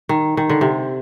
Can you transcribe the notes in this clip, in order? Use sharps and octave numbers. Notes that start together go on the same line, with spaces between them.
D#3
D#3
D3
C3